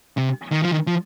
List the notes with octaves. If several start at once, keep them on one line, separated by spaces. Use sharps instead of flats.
C3
D#3
F3
D#3
F3